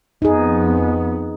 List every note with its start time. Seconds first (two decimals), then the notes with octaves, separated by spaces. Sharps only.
0.22 F2 B3 D#4 G#4